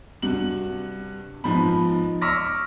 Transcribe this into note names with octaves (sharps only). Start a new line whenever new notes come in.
G2 C3 F#4 F#7
G#2 F3 B3 D#4 B5
C#6 D6 E6 F6 A#6 B6